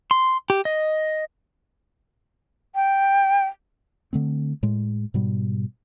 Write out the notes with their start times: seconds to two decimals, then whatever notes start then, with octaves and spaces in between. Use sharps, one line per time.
0.11 C6
0.50 G4
0.65 D#5
2.75 G5
4.13 D3 A3 C4
4.63 A2 G#3
5.14 G#2 B2 G3